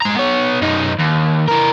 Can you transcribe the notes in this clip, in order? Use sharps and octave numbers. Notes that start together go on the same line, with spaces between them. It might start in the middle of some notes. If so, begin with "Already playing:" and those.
G#3 A#5
B3 C#5
F#2 D#4
D#2
E3 A#4